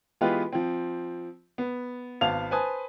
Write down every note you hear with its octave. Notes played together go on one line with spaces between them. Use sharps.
E3 G#3 B3 F4 G4 B4
F3 C4
B3
G#1 B3 F5 A5 F7
B4 C5 G#5 A5 D#6